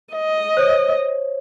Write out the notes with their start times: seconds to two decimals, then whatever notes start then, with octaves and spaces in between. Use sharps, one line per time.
0.14 D#5
0.57 C5 C#5